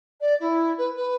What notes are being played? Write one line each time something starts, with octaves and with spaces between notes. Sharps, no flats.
D5
E4
B4
B4